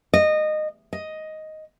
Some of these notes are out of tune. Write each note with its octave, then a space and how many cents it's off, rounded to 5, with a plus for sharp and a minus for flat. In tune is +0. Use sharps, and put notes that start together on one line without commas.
D#5 -20
D#5 +5